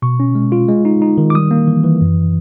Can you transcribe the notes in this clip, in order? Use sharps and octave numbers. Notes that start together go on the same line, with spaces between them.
B2 C#6
C#4
G#3
F4
G#3
D#4
D#4
D#3
D6
G3 D#6
A#3
E3
E3
F#2